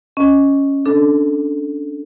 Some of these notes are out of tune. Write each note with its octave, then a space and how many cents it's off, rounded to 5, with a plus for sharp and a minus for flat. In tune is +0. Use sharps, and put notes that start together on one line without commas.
C#4 +0 D#5 +0
D4 +0 A4 +0